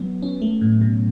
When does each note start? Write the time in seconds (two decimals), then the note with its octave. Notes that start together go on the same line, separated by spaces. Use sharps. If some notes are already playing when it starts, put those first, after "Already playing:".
Already playing: F#3 B3
0.22 C#4
0.42 A3
0.61 A2
0.81 B2